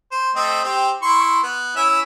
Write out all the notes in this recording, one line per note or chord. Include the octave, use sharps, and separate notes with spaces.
C5
A3 C4 D#5
C4 G4
E4 C6 C#6
B3
C#4 E4 E5